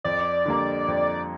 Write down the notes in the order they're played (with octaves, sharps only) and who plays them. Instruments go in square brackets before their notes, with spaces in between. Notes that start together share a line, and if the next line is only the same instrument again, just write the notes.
[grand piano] F2 [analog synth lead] D5
[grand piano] D3 G3 A#3
F2